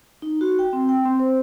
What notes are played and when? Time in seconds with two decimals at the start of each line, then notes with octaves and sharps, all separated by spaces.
0.22 D#4
0.41 F#4
0.59 G5
0.73 C4
0.89 G5
1.06 C4
1.19 C5